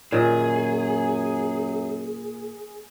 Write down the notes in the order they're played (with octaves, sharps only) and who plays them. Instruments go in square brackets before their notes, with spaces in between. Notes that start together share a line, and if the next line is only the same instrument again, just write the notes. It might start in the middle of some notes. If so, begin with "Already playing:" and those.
[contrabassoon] F#2 [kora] A#2 D#3 [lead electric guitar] G#4